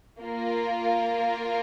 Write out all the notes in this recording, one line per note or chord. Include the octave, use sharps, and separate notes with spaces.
A#3 F4 A#4